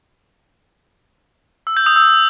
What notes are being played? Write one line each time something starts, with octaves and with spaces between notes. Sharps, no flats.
E6
G6
D#6
E6